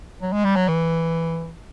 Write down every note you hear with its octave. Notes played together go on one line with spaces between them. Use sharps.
F#3
G#3
G3
F#3
E3